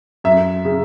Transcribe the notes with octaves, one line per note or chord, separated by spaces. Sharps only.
F#2 E5
C#3